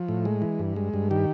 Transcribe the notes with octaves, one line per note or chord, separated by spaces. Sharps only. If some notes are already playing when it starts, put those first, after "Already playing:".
Already playing: F3
A2
G#3
E3
G2
G#3
G2
D#3 G4